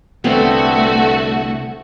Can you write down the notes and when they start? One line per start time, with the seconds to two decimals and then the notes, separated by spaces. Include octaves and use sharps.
0.24 C2 D3 A3 B3 C4 F#4